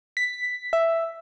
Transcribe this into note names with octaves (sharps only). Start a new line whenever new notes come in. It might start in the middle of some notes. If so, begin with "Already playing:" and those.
B6
E5